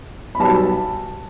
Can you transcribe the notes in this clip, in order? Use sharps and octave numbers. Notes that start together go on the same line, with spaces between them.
B5
B1 B2 G3 B3 A5